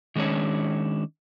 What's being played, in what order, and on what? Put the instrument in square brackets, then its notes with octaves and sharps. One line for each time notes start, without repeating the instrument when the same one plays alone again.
[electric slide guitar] D#3 G#3 C#4 D4 C#5